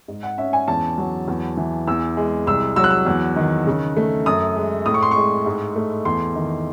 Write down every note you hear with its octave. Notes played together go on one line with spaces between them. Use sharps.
G#2
F#5
C#4 E5
G#5
E2 A5
F#3
E2
E3
E2 E6
G#3
C2 E6
F#3 E6
F#6
E6
E2
D#3
C#3
A3
F#2 D#6
G#3
A2 D#6
C#6
C6
G#3 C#6
G#2
A3
E2 C6
D#3